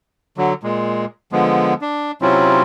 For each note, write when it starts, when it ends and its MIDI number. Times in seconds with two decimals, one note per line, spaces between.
0.37 0.53 50
0.37 0.53 54
0.63 1.05 46
0.63 1.05 56
1.32 1.74 50
1.32 1.74 53
1.32 1.74 56
1.32 1.74 59
1.82 2.12 62
2.22 2.62 48
2.22 2.62 54
2.22 2.62 60
2.22 2.62 61
2.22 2.62 64
2.22 2.62 65